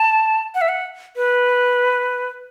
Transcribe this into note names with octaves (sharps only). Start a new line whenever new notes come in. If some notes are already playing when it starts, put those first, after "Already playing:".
Already playing: A5
F#5
E5
F#5
B4